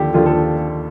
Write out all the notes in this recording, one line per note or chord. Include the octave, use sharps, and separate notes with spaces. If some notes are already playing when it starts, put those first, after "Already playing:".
Already playing: D#2 D3 F3 G4 A4
D#2 D3 F3 F4
A4